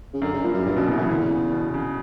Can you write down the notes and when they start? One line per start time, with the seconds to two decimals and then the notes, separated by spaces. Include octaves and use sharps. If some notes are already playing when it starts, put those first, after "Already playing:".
0.14 C#3
0.22 F#2 D3
0.33 C#3
0.44 G2 A#2
0.54 F#2
0.65 G2 A#2
0.76 F#2 B2
0.87 E2 C#3
0.97 F#2 E3
1.09 E2 D3
1.30 C#3
1.52 B2
1.74 C#3